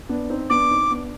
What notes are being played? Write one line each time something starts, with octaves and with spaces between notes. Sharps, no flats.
B3 D4
C4 D#4
B3 D4 D6
C4 D#4
B3 D4